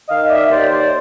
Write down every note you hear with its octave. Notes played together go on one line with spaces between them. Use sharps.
D#3 D#5 F5
D5 E5
D#2 C5 D5
C5 D5